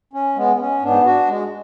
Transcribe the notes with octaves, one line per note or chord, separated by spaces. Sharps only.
C#4
G#3 B3
B3
C#4
G#2 B3 D4
D4 F#4
G#3